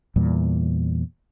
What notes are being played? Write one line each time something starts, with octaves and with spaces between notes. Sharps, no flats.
E2 A#2 G3